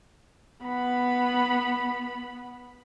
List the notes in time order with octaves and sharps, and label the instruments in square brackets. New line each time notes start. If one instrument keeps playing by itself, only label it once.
[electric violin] B3 B5